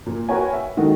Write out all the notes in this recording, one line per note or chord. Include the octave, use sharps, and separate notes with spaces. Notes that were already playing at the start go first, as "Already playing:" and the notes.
A#2
F#4 A#4 B4 C#5 G5 G#5
E5
D#3 G#3 F#4 A4